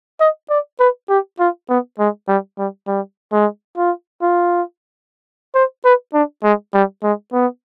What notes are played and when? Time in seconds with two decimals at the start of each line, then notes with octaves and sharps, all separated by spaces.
0.20 D#5
0.50 D5
0.80 B4
1.10 G4
1.40 F4
1.69 B3
1.99 G#3
2.28 G3
2.58 G3
2.87 G3
3.32 G#3
3.77 F4
4.22 F4
5.55 C5
5.85 B4
6.14 D4
6.44 G#3
6.74 G3
7.03 G#3
7.33 B3